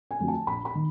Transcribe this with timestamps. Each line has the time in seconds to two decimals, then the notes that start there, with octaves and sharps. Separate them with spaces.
0.11 G#5
0.19 F2 D3 F#3 A3
0.28 A5
0.47 A#1 B5
0.65 B5
0.75 D#3